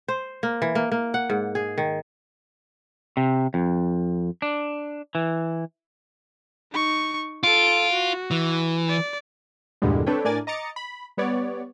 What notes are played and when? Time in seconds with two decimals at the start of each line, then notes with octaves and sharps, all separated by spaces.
0.08 C5
0.43 A#3
0.62 E3
0.75 A#3
0.92 A#3
1.14 F#5
1.30 G#2
1.55 G#4
1.78 D#3
3.17 C3
3.54 F2
4.42 D4
5.15 E3
6.72 D#4 C#6
7.43 F4 A4 D7
7.93 F#4
8.31 E3
8.88 D5
9.82 E2 G2 A#2 D3 G3 G#3
10.06 C4 D4 A4 B4 C#5 G5
10.24 A2 D4 A#4 D5 G#5 A6
10.47 D#5 A#5 D6 A6 C#7
10.76 B5
11.17 G3 B3 C#5 D5